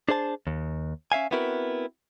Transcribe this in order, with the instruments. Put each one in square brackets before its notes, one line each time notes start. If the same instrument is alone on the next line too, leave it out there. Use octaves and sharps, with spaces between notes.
[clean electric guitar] D4 G#4 C5 A5
D#2
C#4 E5 F5 G#5
B3 C4 E4 F#4 A#4 B4